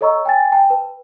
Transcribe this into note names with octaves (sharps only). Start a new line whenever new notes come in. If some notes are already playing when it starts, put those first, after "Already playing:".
A4 C#5 D#5 A#5 C#6 E6
G5 G#5 A6
G5 A5
B4